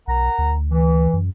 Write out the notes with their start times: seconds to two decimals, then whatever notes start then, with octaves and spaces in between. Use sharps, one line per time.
0.08 B1 A#4 F#5 A#5
0.38 D2
0.70 E3
1.13 F#2